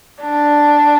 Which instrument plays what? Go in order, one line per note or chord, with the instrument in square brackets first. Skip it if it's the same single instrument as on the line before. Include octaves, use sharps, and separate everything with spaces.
[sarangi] D4